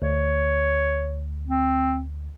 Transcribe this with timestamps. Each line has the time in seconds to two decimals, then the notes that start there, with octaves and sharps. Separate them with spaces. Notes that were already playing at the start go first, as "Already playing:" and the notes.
0.02 D2 C#5
1.48 C4